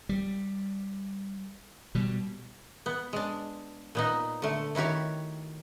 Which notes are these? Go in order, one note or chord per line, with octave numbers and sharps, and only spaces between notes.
G3
B2 G3
B3
G#3 D4
A#2 B3 D#4
D3 A3
D#3 E4 F#4 G4 C#5